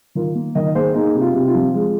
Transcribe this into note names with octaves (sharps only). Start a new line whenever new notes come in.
D#3 F4 A#4
A#3
D#3 A#4 D#5
A#3 G#4 C5
A#3 D#4 G#4
C3
F4
C3
F4
F3
G#3